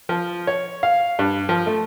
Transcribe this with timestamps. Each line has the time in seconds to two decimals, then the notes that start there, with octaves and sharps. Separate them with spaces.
0.09 F3
0.47 C#5
0.83 F5
1.19 G2
1.49 F3
1.66 A3